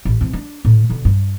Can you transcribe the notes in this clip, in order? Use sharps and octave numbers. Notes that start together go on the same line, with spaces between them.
A1
C3 E3
D4
A2 D3
B2 D3
G2